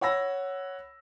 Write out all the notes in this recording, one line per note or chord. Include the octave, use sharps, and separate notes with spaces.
C#5 F#5 B5 E6 A#6